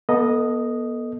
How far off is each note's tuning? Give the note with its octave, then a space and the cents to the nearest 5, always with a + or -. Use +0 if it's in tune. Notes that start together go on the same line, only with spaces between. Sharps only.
B3 -35 A4 +0 D#5 +0